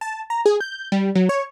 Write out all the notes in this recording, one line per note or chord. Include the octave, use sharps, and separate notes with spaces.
A5
A#5
G#4
G6
G3
F#3
C#5